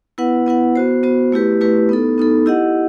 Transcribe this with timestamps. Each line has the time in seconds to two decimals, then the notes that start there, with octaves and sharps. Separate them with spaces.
0.18 B3 E4 B4 F#5
0.46 B3 E4 B4 F#5
0.76 B3 F#4 C5
1.03 B3 F#4 C5
1.32 A3 E4 G4 B4
1.61 A3 E4 G4 B4
1.89 B3 D#4 A4
2.18 B3 D#4 A4
2.46 E4 G4 D#5 F#5